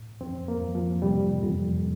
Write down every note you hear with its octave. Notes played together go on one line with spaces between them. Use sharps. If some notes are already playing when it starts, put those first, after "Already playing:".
Already playing: A2
F2 C4
A#3
F2
F3
C3 G3
F2